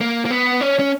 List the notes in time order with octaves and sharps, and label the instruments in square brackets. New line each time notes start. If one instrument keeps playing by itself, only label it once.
[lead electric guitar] A#3
A#3
B3
C#4
C#4